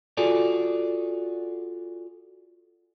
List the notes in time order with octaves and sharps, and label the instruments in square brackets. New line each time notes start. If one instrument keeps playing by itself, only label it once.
[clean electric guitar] F4 F#4 G#4 A4 D5